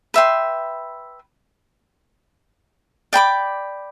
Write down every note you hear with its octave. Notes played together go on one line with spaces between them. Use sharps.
B4 E5 G5 C6
D5 G5 B5 D6